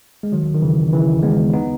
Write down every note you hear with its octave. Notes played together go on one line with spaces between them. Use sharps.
G#3
D#3 F#3
D#3
C#3 E3
D#3
C#3 E3
G#3 B3
B3 D#4